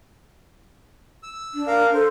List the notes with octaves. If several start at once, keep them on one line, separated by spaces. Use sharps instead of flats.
E6
D4
A#4 F5
A4 C5